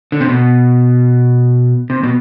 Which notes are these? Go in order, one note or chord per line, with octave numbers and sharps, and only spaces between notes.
D3
C3
B2
C3
B2